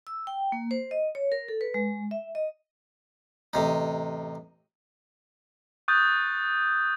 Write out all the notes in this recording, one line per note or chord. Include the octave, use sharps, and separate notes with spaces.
E6
G5
A#3
C5
D#5
C#5
A#4
A4
B4
G#3
E5
D#5
A1 C3 D#4
C#6 D#6 F#6 G6 A6